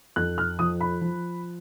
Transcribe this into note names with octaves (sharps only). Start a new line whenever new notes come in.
F2 F#6
F6
F3 D#6
B5
F3